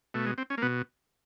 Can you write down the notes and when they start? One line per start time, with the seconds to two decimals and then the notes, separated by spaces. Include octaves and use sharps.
0.14 B2 A3
0.26 G#3
0.38 C4
0.50 C#4
0.58 A#3
0.62 B2 B3